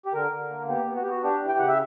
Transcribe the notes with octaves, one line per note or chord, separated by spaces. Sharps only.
G4
D3 A#4
D3
A#3
B3 G4
B3
F#4
B3 G4
F#4
D4 G4
E3
G5
C#3 F#5
E5